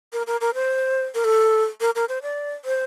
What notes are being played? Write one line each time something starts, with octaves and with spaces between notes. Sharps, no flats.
A#4
A#4
A#4
C5
A#4
A4
A#4
A#4
C5
D5
C5